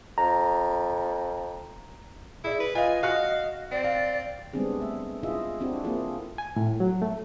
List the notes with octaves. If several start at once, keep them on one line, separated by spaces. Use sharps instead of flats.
F2 A#5
E4 G#4 D5
B4
F4 B4 D#5 F5 G#5
F#4 F5 F#6 C#7
C4 D5
F5
G3 G#3 B3 C4 D4 G#4
A3 E5
E4 F4 G#4 D#5 E5
C4 D4 E4 F#4 G4
A#3 C4 E4 F4 G#4 A4
G#5
A2
F#3
A3